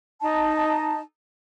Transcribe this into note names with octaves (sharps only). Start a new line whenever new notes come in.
D#4 A5